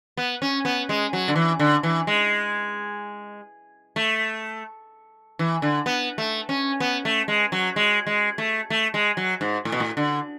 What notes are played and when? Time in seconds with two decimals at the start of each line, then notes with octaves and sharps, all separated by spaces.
0.17 B3
0.42 C#4
0.65 B3
0.89 G#3
1.13 F#3
1.28 D3
1.36 E3
1.59 D3
1.83 E3
2.07 G#3
3.96 A3
5.39 E3
5.62 D3
5.86 B3
6.18 A3
6.49 C#4
6.80 B3
7.05 A3
7.28 G#3
7.52 F#3
7.76 G#3
8.07 G#3
8.38 A3
8.70 A3
8.94 G#3
9.17 F#3
9.41 G#2
9.65 A2
9.72 B2
9.80 A2
9.97 D3